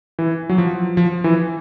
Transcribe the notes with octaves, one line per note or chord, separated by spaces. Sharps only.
E3
F#3
F3
F3
E3